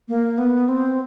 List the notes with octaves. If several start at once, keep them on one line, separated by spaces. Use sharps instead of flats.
A#3
B3
C4